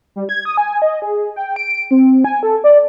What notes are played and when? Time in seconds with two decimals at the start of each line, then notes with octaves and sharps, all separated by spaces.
0.16 G3
0.29 G#6
0.45 D#6
0.57 G#5
0.82 D#5
1.02 G#4
1.36 G5
1.56 D7
1.91 C4
2.25 G#5
2.43 A4
2.64 D5